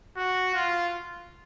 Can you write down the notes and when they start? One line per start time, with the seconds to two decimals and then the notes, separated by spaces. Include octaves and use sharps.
0.16 F#4
0.55 F4